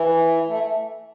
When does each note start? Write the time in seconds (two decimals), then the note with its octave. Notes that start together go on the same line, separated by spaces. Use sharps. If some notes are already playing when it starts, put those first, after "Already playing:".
Already playing: E3
0.48 A3